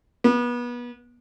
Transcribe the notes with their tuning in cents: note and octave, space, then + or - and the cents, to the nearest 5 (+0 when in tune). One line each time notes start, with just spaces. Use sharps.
B3 -30